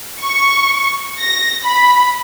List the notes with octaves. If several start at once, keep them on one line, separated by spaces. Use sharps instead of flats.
C#6
A#6
B5